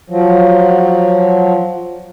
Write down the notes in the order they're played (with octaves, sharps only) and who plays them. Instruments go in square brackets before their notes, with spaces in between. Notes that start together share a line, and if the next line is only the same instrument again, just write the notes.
[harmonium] F3 F#3